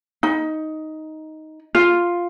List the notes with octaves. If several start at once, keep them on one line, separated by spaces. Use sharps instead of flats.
D#4
F4